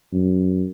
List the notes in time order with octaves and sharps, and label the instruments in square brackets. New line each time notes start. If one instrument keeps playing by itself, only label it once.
[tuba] F#2